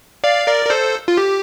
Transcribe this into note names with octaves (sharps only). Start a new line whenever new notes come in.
D5 F5
A#4 D5
A#4
A4 C5
F4
G4